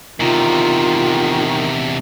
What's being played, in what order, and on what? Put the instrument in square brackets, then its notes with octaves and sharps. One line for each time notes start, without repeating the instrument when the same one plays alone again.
[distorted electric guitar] E2 C3 [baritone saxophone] D#3 [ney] F4